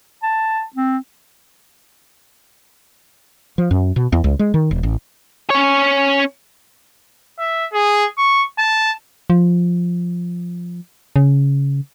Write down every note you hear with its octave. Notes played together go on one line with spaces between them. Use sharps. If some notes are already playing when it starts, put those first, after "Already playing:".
A5
C4
F3
F#2
B2
E2
C#2
G#3
D#3
E1
A1
C#4 C#5
E5
G#4
C#6
A5
F3
C#3